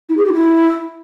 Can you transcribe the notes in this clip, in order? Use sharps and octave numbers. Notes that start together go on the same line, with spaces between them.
E4
G#4
G4
E4